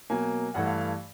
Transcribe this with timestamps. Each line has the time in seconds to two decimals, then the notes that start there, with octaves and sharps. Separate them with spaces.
0.10 B2 F#3 A#3 G#5
0.54 G2 E3 A3 F#5
0.66 F5
0.77 F5